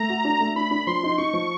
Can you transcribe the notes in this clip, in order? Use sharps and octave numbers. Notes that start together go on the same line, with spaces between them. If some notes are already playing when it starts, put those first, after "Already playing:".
Already playing: A3 A#5
F#4
D4
A3
D4 B5
D4
F3 C6
D#4
D#4 C#6
F3